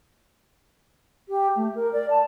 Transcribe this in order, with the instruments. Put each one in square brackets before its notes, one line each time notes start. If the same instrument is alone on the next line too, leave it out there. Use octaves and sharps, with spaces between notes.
[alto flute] G4
A3
A#4
D5
A5